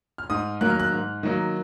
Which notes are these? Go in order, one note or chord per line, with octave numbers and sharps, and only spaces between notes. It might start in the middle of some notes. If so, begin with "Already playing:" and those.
F6
G#2 D#6
D#3 F#3 A#3 F#6
F6
F#6
G#2
D#3 F#3 A#3